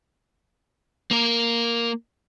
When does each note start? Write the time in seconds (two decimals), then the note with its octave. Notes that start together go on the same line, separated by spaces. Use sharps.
1.11 A#3 A#4